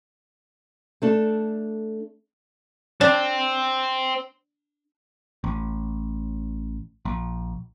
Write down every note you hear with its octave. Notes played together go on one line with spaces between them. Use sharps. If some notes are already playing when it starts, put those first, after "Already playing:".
A3 D4 A4
C4 D4
A1
A#1